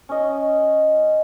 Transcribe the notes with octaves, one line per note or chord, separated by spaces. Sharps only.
C#4 D#5